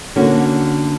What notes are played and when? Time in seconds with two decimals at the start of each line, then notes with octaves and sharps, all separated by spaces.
0.16 D3 A#3 C#4 F#4